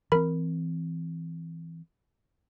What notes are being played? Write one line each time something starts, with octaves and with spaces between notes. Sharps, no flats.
E3 C4 A#4 B5